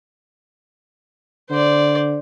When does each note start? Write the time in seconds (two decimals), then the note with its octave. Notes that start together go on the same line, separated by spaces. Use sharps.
1.50 D3 C5 D5